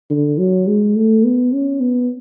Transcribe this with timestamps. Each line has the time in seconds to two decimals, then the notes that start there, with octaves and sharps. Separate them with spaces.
0.10 D3
0.38 F#3
0.67 G#3
0.95 A3
1.25 B3
1.53 C#4
1.81 B3